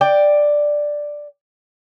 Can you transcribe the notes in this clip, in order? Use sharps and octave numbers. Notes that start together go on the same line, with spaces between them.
D5 G5